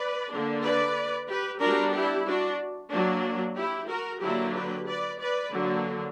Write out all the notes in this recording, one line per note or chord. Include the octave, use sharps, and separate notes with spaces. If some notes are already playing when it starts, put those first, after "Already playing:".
Already playing: B4 D5
D3 A#3 D4
B4 D5
G4 B4
G3 B3 D4 F#4 A#4
E4 G4
D4 F#4
F#3 A#3 D4
E4 G4
F#4 A#4
D3 F#3 A#3 D4 E4 G4
G4 B4
B4 D5
B4 D5
D3 F#3 A#3 D4